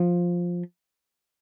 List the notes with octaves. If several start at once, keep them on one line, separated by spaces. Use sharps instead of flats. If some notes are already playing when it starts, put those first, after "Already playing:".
Already playing: F3